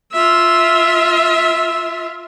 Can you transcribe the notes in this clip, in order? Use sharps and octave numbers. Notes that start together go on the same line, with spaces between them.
F4 E5